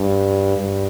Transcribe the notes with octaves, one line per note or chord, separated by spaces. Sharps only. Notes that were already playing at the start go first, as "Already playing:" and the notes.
Already playing: G2
G2